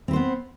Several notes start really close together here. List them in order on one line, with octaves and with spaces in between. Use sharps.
C4 B4 C5 B3